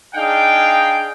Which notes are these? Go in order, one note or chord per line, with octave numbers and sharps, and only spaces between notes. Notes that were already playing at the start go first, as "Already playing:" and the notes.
D4 D#4 G#4 F5 G5